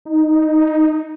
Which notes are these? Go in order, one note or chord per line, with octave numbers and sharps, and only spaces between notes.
D#4